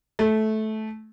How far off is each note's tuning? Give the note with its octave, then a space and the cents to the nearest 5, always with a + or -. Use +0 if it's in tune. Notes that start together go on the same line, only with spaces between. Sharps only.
A3 -15